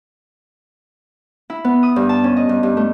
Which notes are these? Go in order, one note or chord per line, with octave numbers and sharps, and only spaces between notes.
E4
B3
D#6
G2
A5
C#4
D#5
G2
G2
A3